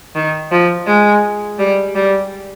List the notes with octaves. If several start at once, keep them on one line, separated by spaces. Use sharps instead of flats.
D#3
F3
G#3
G3
G3